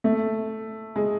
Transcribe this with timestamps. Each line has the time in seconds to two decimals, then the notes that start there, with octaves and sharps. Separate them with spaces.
0.04 A3
0.96 G#3